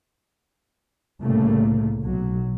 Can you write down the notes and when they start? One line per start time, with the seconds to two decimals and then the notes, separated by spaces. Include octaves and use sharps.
1.22 C2 A2 C#3 A3 A#3
2.03 B1 F#3